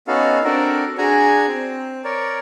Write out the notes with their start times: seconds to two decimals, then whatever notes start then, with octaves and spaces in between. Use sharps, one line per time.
0.08 B3 C#4 D#4 F#4 A4 F5
0.44 C4 D4 F#4 A4 A#4
0.98 D4 F#4 G#4 G#5 A#5
1.48 C4
2.04 A#4 C#5 D5